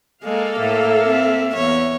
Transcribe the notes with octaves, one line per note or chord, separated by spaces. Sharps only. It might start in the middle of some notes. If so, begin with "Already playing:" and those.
G#3 A#3 A4 F5
A2 E5
C4
E2 C#5